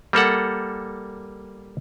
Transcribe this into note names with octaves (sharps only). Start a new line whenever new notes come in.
G3 A#3 A4 F#5